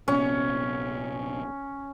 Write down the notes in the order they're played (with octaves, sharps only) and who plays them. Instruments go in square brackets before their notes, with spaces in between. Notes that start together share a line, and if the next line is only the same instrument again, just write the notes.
[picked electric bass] A#1 C3 B3 [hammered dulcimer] C#4